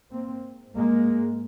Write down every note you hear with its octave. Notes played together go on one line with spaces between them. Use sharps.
G#2 A#3 C4
G#3 A#3